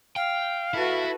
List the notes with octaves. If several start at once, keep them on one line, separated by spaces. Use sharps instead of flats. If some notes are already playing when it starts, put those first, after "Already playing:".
F5 G5
E4 F#4 A4 B4